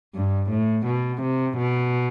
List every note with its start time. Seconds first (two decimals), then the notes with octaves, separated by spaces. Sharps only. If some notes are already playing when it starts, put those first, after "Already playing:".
0.15 G2
0.50 A2
0.87 B2
1.22 C3
1.58 B2